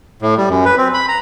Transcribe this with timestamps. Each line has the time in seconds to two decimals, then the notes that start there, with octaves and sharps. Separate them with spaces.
0.22 A2
0.38 G3
0.50 F#2
0.65 B4
0.78 C4
0.94 B5
1.08 A#5